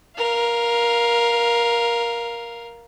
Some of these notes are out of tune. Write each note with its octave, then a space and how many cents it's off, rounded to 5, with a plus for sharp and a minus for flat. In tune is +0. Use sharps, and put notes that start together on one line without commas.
A#4 +15 F5 +0